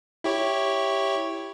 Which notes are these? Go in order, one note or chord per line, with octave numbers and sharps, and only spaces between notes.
E4 G4 C#5